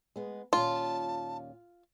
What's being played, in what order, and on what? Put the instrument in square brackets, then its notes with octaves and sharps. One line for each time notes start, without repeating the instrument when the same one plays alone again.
[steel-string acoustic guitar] G#3 B3
[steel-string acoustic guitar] D#2 A#2 C#4 [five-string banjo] F4 [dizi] A5